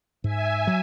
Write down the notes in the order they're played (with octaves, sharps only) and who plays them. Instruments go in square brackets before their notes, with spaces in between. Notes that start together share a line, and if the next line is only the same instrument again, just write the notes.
[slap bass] G#2 [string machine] E5 G#5
[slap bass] F#3